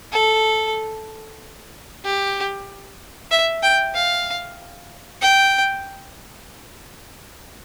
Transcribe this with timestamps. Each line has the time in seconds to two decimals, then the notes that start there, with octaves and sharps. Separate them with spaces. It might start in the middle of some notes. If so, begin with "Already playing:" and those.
0.12 A4
2.04 G4
3.31 E5
3.63 G5
3.94 F5
5.22 G5